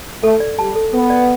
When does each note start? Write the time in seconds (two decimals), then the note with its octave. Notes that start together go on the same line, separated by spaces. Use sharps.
0.23 A3 A4
0.40 D5
0.58 G3 A5
0.76 A4
0.93 B3 A4
1.10 D5